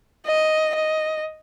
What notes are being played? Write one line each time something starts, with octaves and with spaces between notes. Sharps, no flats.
D#5
D#5